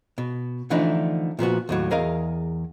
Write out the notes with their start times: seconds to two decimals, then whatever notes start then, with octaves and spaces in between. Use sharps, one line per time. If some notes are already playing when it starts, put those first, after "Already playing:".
0.18 B2
0.70 D3 E3 F3 A3 D4 D#4
1.39 A#2 F3 B3 F#4
1.69 D#2 A2 F#3
1.91 E2 G#4 A#4 D#5 F5